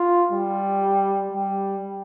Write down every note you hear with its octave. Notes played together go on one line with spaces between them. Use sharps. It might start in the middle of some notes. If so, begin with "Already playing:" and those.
Already playing: F4
G3
G3